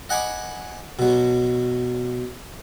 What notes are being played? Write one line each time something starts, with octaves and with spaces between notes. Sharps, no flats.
D#5 F#5 G#5 B5 D6
B2 F#3